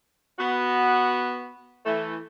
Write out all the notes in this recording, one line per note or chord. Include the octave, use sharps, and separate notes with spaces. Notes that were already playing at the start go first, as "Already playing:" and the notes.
B3 F#4
E3 A3